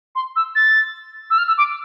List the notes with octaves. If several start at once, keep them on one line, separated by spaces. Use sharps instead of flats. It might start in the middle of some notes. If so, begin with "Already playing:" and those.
C6
E6
A6
E6
F6
E6
D6